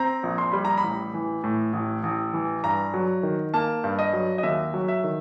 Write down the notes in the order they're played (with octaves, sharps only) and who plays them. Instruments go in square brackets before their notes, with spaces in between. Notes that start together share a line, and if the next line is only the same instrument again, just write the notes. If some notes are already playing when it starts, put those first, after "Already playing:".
Already playing: [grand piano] C4 A#5
A#1
C6
G3 B5
A#5
B5
A1
E3
A2
A1
A1
E3
G2 A#5
F#3
D#3
A#3 A5
G2
D#5
F#3
D#5
D#2 E5
F#3
E5
D#3